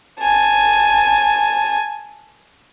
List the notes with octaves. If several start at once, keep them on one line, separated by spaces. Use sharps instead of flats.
G#5 A5